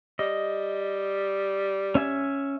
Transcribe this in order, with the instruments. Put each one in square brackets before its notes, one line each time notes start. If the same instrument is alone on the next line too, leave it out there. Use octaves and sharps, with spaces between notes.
[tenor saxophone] G3 [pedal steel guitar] D#5
[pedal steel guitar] C#4 E5 G#5